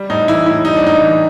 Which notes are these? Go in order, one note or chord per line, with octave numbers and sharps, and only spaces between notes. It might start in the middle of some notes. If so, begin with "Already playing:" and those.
Already playing: G3
A2 D#4
E3 E4
A2 E4
G3 D#4
D4
A2 D#4
E3